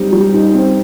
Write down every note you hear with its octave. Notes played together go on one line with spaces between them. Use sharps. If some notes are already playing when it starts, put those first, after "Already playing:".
Already playing: G3 C4 D#4
G3
D#4
C4